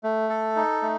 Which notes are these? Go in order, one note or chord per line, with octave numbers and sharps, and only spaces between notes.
A3
A4
D#4
A3